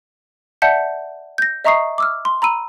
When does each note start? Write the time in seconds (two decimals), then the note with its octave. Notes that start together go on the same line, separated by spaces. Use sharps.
0.62 D5 E5 F#5 A5 G6 C#7
1.38 G6 A#6
1.64 D#5 E5 A#5 C#6 D#6 C7
1.98 D6 E6 F6
2.25 C6
2.42 A#5 B5 E6 D#7